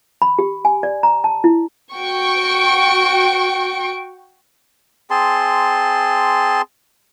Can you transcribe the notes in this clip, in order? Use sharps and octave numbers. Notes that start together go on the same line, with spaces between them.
B5
G4
G#5
D5
A#5
A5
E4
F#4 G5 C#6 D7
C4 G#4 A5 C6